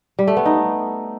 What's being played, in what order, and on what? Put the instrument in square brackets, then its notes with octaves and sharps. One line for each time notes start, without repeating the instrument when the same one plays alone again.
[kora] G3
A3
B3
D#4